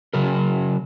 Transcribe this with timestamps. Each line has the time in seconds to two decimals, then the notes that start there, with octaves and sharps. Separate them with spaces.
0.14 C#3 F#3 A#4